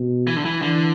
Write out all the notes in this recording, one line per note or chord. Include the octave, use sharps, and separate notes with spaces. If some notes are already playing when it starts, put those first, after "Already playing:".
Already playing: B2
E3
D3
E3
D3 E3